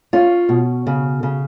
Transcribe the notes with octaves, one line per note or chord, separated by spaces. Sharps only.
C#4 F4
B2
C#3
C#3